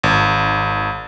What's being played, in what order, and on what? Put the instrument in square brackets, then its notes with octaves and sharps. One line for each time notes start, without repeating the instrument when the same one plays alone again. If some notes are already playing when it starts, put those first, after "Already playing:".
[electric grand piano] G#1